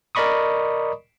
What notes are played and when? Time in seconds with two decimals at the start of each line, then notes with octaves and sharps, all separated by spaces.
0.15 A#4 D5 D#5 B5 C#6 D#6